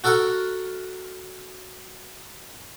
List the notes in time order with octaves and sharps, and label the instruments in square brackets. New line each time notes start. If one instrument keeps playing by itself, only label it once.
[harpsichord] F#4 A4 A#4 F#5 C#6